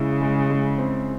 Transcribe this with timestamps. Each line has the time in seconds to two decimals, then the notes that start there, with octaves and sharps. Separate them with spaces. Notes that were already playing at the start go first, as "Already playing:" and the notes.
Already playing: C#3 G#3 E4
0.22 G#3
0.50 G#3
0.78 C4